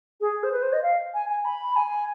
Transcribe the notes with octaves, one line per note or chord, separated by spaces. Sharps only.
G#4
C5
B4
C5
D#5
F5
G#5
G#5
B5
G#5